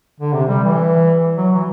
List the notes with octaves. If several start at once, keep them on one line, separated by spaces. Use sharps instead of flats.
D3
C3
G3
E3
F#3
E3